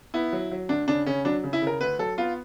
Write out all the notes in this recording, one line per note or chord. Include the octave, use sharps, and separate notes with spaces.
B3 E4
F#3
F#3
D2 D4
C#3 D4
C#3 C#4
F#3 D4
C#3
E4
C#3
A#4
D2 B4
F#3 A4
B3 F4